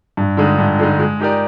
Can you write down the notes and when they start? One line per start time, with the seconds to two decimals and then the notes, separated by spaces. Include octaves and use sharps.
0.17 G2
0.37 D3 G#3 D#4
0.59 G2
0.79 D3 G#3 D#4
1.00 G#3
1.20 D#4 G4 A#4 D5